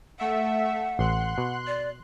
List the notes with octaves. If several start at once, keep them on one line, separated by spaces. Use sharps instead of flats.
A3 E5 F#5
A1 C6 F#6
B2
D5